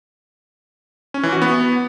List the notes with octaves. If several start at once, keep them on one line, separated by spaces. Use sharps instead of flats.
C#4
E3
F#4
B3